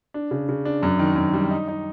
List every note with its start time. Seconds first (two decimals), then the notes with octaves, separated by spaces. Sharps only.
0.14 D4
0.31 C#3
0.49 C#3
0.65 D4
0.83 F#2
0.99 D#3
1.16 F#2
1.33 G3
1.51 D#4
1.68 D#4